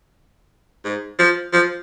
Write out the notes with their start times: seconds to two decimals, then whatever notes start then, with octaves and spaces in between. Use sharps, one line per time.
0.85 G#2
1.19 F3
1.53 F3